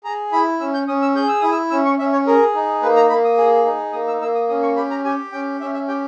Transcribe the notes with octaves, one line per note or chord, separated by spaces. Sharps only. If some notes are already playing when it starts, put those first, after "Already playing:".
G#4 A#5
E4 B5
C#4 E6
G6
C#4 D#6
E6
G#4 G6
E6
E4 D#6
E6
C#4 E6
C#6
C#4 E5
C#5
G#4 A#4
D#4
A#3 B4
A#5
A#3 B5
D#6
G#4
D#4
A#3 D#6
E6
A#3 E6
D#6
C#4 D#6
C#6
G4 B5
A#5
G4 G#5
C#4 G5
C#4 E5
E5
G4 G5